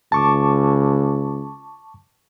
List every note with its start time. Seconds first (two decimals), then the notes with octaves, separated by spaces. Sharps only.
0.12 C#2 A5 C#6 D6